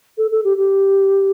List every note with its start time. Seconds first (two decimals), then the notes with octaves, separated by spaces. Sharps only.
0.18 A4
0.31 A4
0.44 G4
0.57 G4